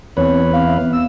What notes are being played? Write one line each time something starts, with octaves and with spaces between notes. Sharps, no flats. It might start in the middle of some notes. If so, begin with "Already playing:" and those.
E2 C4 B4 C#5
C4 F5
E5
B3
E6